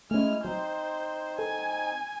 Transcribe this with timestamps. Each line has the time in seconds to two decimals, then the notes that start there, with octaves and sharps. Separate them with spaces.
0.11 G#3 A3 C#4 E4 G#5 F6
0.44 F#3 C4 D#4 C5
1.39 A4 G#5